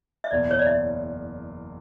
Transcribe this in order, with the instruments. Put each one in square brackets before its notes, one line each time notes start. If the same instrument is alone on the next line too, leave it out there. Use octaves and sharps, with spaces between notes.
[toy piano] E5
[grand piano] F#1 E2 B2 [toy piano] D5
[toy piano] C#5
D5
E5